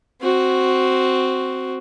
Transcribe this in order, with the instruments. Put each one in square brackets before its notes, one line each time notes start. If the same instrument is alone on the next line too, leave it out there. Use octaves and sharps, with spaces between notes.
[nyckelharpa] C4 F#4